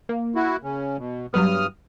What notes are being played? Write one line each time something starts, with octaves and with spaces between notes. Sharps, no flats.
A#3
E4 F#4
C#3 C#4
B2
G2 F#3 G3 B3 D#6 F6